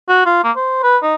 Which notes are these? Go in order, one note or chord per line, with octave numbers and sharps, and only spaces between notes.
F#4
F4
A#3
C5
B4
D#4